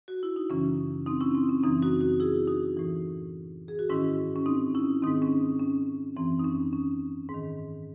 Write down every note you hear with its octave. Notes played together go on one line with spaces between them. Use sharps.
F#4
E4
D#4
F#2 C#3 E3 C#4
C4 D#4
C#4 E4
C4
C#4
F#2 C#3 E3 C4 D#4
D#4 F#4
D#4 F#4
E4 G#4
D#4 F#4
A2 E3
G#4
F#4
G#2 D#3 C#4 E4
C#4
C4 D#4
C#4 E4
G#2 D#3 C4 D#4
C#4
C#4
F#2 E3 C4
D#4
C#4
C#4
G#2 D#3